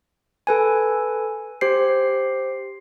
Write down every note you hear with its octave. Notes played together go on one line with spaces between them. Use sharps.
A4 B4 G#5
G4 C5 C7